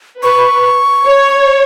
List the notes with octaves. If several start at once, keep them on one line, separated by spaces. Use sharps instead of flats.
B4 C#6
C#5